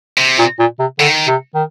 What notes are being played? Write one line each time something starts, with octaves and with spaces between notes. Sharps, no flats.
C3
A#2
A#2
C3
D3 D#3
C3
D#3